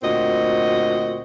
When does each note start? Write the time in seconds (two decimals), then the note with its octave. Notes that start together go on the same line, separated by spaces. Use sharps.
0.03 D2 A#2 C4 F#4 D#5